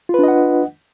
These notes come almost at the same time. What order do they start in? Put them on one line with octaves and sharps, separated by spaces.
F4 B4 D4 D#5 F#5